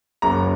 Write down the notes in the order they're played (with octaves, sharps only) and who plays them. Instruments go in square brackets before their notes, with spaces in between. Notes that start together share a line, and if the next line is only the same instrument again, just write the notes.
[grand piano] F#1 F#2 C#3 F#3 A#3 A#5